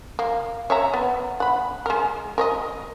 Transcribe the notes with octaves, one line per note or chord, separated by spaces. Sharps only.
A#3
C#5 E5 A#5
B3
F#5 B5
G#3 A#4
A#4 C#5 D#5